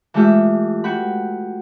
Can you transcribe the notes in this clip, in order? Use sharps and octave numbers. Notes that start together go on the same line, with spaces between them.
E3 G#3 A3 F4 G4 E5
F#4 G5 B5